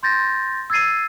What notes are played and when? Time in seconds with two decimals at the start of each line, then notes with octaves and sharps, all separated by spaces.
0.03 C6 G6 A6 A#6
0.70 E6 G#6 A6 C7 D#7